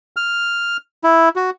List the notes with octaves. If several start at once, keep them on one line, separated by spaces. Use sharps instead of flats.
F6
E4
F#4